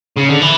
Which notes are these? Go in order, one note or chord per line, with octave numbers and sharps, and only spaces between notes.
C#3
D3
E3